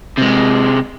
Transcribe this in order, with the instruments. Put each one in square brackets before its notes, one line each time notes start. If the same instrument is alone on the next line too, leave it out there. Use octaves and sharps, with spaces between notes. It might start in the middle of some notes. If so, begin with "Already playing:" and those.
[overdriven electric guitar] C3 G#3